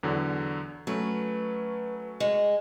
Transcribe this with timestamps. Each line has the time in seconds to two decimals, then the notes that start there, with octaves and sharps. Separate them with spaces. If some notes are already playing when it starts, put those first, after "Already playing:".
0.03 E2 D3 F#3
0.87 F#3 A3 C#4 B4
2.20 G#3